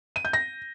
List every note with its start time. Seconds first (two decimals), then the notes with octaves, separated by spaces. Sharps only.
0.16 D#7
0.25 G6
0.33 A#6